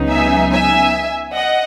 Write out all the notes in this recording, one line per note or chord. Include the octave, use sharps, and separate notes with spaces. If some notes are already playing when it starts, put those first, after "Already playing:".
Already playing: C#2 C#3 F#3 B3 D#4
E5 G#5
E5 G#5
D#5 F#5